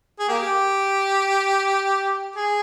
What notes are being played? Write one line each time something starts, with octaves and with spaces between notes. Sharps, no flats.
G#4
A#3 G4
G#4